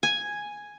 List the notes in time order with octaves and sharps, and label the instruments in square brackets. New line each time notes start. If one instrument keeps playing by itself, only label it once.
[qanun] G#5